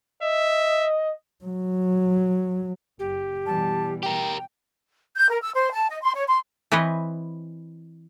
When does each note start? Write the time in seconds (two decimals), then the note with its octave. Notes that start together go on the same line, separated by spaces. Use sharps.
0.23 D#5 E5
1.44 F#3
2.99 F#1 G4
3.46 B2 E3 G3 A5
4.03 G4 A#4 G5
5.15 G6
5.29 A#4
5.42 E6
5.54 C5
5.72 A5
5.89 D#5
6.02 C6
6.14 C#5
6.26 C6
6.72 E3 C4 B4 C#5 D#5